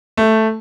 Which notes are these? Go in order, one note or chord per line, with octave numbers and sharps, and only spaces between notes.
A3